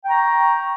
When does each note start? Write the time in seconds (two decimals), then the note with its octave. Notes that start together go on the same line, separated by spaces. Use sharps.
0.04 G5
0.07 A#5
0.10 C#6